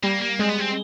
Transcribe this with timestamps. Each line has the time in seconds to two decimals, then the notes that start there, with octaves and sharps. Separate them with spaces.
0.03 G3 A#3
0.21 A#3
0.39 G#3 C4
0.49 B3
0.60 C4